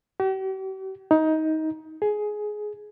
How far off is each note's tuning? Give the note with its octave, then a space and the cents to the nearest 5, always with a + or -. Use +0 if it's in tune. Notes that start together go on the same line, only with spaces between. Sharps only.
G4 -45
D#4 +20
G#4 +15